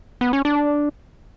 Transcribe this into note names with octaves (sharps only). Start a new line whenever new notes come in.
B3
C#4
D4